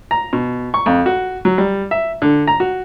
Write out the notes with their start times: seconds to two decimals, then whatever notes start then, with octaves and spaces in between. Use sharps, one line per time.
0.11 A#5
0.33 B2
0.74 C#6
0.86 F2
1.06 F#4
1.45 F#3
1.58 G3
1.91 E5
2.22 D3
2.47 A#5
2.60 F#4